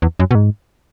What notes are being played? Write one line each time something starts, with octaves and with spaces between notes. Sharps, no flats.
E2
F#2
B2
G#2